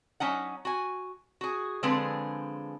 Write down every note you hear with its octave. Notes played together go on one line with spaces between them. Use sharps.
F#3 C#4 D#4 F#5
F#4 G#5
F#4 G#4
D3 F3 G#3 C4 G#4 B4